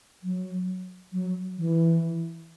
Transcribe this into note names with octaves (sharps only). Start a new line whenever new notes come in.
F#3
F#3
E3